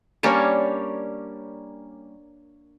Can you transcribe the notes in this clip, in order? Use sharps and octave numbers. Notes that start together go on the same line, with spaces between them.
G3 A#3 C#4 D4 A#4 C#5